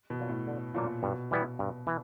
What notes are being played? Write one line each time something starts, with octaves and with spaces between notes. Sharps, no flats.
B2
F#3 A#3 D4 F4
A2
D3
A#2 F#3 A#3 D4 F4
G2 B2
E3 G3 B3 E4
G2
E3